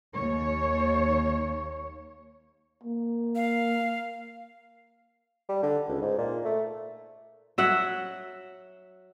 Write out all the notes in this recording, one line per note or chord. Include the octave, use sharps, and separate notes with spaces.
D#2 C#5
A#3
F5
G3
D3
C#2
G#2
A#2
A3
F#3 E5 F#5